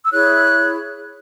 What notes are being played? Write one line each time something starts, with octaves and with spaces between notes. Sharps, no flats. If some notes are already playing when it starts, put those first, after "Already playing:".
E6
E4 G#4 C#5 F#6